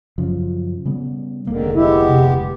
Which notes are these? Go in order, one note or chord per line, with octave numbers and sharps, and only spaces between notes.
F#2 C#3 F3
C#3 G3 B3
F1 D2 G#2 D3 D#3 A#3
G#3 B3 E4 G4
C3